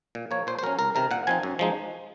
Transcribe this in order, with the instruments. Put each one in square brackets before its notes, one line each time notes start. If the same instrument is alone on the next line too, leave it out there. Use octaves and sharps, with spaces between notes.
[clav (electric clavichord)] A#2
F3 A#3 C#5
A#2 C5
C5
F#3 C#4 A#4
C2 A#4
C3 D#3 A#4
A#2 F#5
F3 C4 D#4 G#5
F#2
F3 G#3 D#4